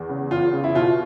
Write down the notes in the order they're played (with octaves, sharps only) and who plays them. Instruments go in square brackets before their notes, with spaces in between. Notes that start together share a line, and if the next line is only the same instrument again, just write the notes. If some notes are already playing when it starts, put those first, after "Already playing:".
Already playing: [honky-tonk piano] E2
C#3
[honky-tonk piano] E2 [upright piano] F4
[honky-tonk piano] C#3
[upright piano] E4
[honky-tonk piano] B2 [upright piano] F4